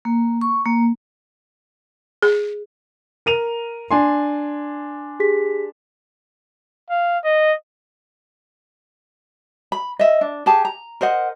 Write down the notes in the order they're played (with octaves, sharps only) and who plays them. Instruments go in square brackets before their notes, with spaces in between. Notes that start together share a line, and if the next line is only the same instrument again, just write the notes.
[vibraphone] A#3
C#6
A#3
[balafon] G#4
[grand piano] A#4 D#7 F7
D4 G#5 C6
[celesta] G4 G#4 B6
[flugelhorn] F5
D#5
[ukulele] B5
D#5 E5
D4
G4 G#4 A5
A#5
A#4 C5 D#5 F#5